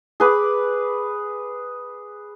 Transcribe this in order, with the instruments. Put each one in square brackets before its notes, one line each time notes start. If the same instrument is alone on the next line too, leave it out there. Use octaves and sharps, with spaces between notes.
[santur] G#4 B4 D6